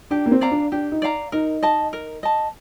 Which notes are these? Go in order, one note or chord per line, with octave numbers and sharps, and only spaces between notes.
D4 G4
A#3
C4
D5 F5 A#5
D4
D4 G4
D#4
D5 F5 A#5
D#4 A#4
D#5 A5
A#4
D#5 A5